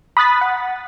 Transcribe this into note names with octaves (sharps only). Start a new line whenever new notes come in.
B5 D#6 F#6 A6 B6
F#5